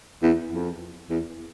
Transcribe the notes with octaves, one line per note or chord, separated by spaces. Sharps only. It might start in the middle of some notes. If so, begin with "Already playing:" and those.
E2
F2
E2